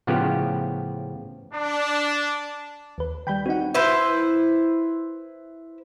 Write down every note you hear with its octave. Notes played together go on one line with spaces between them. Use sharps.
A2 C#3 F3 B3 F4 G4
D4
D#2 B4
D#3 G3 G5 B5 G6
C4 D#4 F#4 F#5
E4 B4 C5